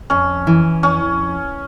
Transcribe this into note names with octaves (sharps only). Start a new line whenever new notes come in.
F2 C#4
E3
F2 C#4